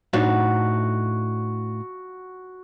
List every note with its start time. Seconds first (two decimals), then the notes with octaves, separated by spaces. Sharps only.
0.13 A2 D4 D#4 F#4